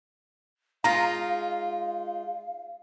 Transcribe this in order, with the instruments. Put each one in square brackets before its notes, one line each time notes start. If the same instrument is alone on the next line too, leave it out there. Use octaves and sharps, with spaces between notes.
[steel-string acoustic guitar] G#3 D#4 F4 [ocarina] F5 [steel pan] A#5